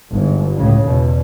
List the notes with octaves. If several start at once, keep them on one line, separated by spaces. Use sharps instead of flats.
G1 G#2
C#2 A2 C#3
E2 B2